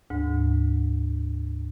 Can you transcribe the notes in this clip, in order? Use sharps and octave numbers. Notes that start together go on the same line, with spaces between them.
D2 G#2